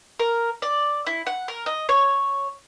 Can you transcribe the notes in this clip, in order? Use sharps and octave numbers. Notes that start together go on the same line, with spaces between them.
A#4
D5
E4
F#5
A#4
D#5
C#5